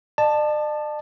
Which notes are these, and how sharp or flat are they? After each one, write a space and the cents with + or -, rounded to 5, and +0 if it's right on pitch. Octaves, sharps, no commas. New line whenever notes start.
D5 +45 A5 +0